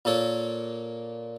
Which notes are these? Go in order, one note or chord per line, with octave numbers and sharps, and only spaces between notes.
A#2 A#3 A4 C#5